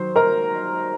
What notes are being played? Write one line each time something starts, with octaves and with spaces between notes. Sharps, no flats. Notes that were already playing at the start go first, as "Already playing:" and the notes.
Already playing: D#3 F#3 C5
A#4 A#5